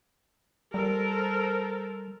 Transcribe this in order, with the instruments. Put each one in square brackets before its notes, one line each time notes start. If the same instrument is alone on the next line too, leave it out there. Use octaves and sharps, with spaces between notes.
[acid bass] G3 [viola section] A4 A#4 C5